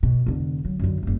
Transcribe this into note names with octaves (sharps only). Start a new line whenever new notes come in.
B2
F1 D3
F#3
F#2 D3
F#1 G2